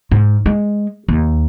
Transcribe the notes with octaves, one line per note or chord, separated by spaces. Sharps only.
G#2
G#3
D#2